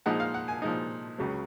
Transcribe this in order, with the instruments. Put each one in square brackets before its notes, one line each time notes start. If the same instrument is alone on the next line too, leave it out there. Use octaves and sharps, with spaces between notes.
[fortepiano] A#2 F3 G#3 D#4 F#5
F5
F#5
G#5
A#2 F3 G#3 D#4
C#2 C#3 F#3